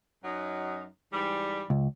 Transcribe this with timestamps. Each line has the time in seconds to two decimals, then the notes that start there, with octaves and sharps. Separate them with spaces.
0.24 F#2 F#3 D#4
1.13 G#2 E3 G3
1.70 C#2